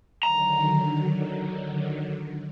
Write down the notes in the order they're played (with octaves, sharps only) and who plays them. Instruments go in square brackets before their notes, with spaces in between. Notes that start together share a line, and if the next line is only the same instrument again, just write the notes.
[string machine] D3 D#3 F#3 [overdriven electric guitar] A#5